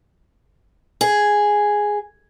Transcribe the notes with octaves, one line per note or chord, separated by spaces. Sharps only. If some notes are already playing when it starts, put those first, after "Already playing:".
G#4